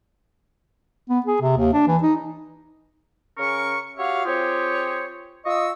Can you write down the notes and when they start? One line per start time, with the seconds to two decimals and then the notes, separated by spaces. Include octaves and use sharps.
1.09 B3
1.26 G#4
1.41 C3
1.57 D#2
1.73 D4
1.88 E3
2.03 D#4
3.38 C#3 C#4 A#4 C#6
3.97 F#4 G4 C#5 E5 F5
4.25 C4 F4 G4 G#4 C#5
5.46 F4 D#5 C#6 D#6 E6